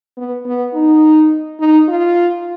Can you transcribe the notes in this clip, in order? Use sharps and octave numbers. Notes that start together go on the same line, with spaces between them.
B3
B3
D#4
D#4
F4